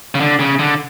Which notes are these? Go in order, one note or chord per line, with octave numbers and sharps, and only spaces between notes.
C#3
D3
C#3
D3